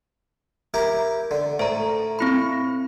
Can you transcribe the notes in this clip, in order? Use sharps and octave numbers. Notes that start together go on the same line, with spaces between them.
E4 G4 A#4
D3
A2 C5 A#5
C4 E4 B5